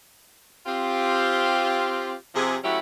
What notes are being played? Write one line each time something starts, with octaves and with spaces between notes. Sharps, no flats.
C4 F4 G4
C3 F3 G#4
F#3 A3 C#4 E4 F#4 G4